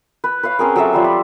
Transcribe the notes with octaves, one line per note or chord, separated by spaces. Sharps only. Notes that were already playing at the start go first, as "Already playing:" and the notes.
B4
B4 C#5 F5
C4 C#4 G#4 A#4
F#3 A4 E5 D6
F3 G3 F5
B5